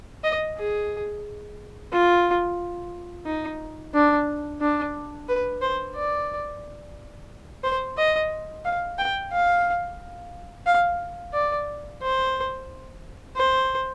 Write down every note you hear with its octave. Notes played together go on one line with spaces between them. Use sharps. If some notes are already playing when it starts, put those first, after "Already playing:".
D#5
G#4
F4
D#4
D4
D4
B4
C5
D5
C5
D#5
F5
G5
F5
F5
D5
C5
C5